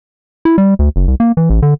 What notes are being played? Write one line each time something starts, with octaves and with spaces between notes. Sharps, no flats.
E4
G3
D2
F#1
C2
A#3
E3
A1
D3